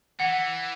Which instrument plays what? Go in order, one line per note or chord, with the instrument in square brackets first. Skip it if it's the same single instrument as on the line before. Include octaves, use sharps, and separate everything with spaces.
[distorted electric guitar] E3 [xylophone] F#5